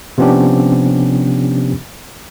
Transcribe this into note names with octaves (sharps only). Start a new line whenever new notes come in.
C3 F3 B3 C#4 D4 G4